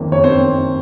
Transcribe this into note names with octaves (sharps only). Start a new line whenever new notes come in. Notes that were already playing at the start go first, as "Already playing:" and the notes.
Already playing: F#1 F2 D#3 A#3
C#5
C4 C5